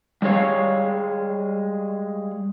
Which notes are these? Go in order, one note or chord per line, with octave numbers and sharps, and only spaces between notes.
G3 G#3 G#4 C#5 F5